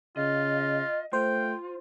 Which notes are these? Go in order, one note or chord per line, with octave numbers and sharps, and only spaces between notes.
C#3 F4 D#5
A3 F4 C5 G5